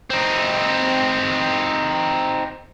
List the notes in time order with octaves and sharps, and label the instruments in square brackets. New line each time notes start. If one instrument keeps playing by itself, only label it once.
[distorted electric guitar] C4 D#4